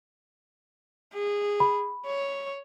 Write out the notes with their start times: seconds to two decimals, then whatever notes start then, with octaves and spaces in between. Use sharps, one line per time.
1.13 G#4
1.60 B5
2.06 C#5